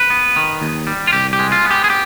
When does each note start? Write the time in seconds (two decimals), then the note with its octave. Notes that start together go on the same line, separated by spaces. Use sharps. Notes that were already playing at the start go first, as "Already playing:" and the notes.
Already playing: B4
0.10 B3
0.36 D#3
0.61 D#2
0.87 G3
1.07 F4
1.13 C2 G4
1.33 G4
1.39 G#3
1.52 F4
1.65 B3
1.71 G4
1.84 G#4
1.90 G4